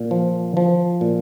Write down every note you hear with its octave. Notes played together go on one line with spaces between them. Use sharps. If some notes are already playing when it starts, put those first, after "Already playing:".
Already playing: A#2
F3
F3
A#2